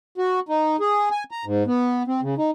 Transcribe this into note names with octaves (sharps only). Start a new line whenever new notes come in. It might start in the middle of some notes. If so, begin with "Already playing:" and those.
F#4
D#4
G#4
G#5
A#5
G#2
B3
C4
C#3
D#4